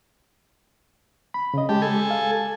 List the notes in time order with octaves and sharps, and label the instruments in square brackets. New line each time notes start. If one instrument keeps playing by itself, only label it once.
[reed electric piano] B5
C#3 D#5
[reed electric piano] G#3 A5 [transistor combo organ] G4
[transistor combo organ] A4 G#5
[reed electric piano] F5